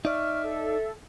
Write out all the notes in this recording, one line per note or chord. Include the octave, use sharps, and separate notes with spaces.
D#4 D5 E5 C#6 F6
A4